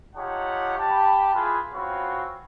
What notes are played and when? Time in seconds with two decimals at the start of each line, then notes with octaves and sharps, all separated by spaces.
0.15 D#4 F4 G4 C#5 F#5 A5
0.77 G4 A5 B5
1.34 E4 F4 G#4 B4
1.73 C4 C#4 F4 F#4 B4 C#5